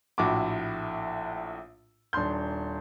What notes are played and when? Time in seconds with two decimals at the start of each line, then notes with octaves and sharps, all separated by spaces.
0.18 A#1 A2 E4 F#4 D6
2.13 D#1 D4 C6 G6